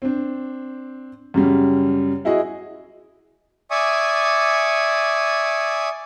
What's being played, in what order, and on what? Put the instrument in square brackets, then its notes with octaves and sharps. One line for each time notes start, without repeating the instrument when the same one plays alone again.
[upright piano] C4 D4
F#2 C#3 G3
E4 F#4 G#4 D#5
[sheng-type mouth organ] D5 E5 G#5 C#6 D#6